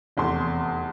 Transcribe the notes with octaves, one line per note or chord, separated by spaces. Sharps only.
F1 E2 A4 C6